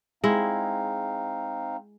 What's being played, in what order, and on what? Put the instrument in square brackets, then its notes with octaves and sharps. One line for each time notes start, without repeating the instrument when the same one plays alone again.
[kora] G#3 E4 [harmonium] C4 D#4 F5